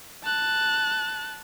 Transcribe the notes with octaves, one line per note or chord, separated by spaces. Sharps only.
A5 F#6